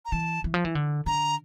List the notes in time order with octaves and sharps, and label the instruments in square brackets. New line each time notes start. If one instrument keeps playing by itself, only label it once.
[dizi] A#5
[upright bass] E3 [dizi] A5
[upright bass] E3
F3
E3
D3
[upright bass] D3 [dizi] A#5